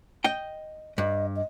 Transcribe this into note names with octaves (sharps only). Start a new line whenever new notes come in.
D#5 G5
G2 D#5
D#5